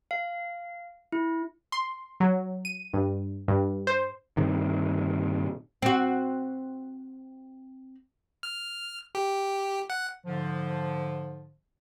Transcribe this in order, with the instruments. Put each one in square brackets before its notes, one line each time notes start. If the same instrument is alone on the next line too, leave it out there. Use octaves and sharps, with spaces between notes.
[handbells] F5
E4
[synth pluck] C6
F#3
D#7
G2
G2
C5
[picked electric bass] G2 C3 D#3
[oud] C4 F#4
[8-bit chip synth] F6
G4
F#5
[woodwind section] G#2 D3 F3